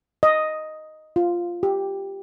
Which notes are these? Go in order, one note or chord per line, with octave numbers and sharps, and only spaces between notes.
D#5
F4
G4